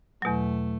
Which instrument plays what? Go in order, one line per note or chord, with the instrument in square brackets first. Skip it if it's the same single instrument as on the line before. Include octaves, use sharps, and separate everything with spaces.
[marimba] E2 B2 F#3 [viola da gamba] A3